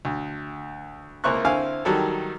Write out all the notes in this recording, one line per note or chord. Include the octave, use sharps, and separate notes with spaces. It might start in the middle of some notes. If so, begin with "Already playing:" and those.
D2
C#2 A#3 E4 C5 C#6 F#6
D3 C4 E4 F5 G#5 C#6
D#3 F#3 G3 F#4 A4